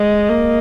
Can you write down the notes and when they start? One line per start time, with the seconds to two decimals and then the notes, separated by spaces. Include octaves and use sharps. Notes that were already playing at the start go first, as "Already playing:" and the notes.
Already playing: G#3 D#5
0.30 A#3